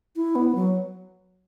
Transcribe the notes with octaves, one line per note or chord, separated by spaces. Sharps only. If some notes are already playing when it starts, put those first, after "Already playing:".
E4
B3
F#3